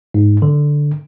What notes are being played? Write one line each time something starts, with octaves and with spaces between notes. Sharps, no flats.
G#2
D3